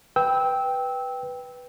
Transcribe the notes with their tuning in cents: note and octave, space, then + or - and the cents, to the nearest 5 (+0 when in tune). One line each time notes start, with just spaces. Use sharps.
B4 +0 G5 +0 E6 -20